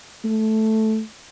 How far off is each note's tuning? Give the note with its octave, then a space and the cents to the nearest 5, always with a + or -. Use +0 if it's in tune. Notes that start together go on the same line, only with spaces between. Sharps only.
A3 -5